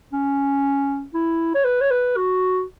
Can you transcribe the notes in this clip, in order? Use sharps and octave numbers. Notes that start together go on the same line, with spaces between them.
C#4
E4
C#5
B4
C#5
B4
F#4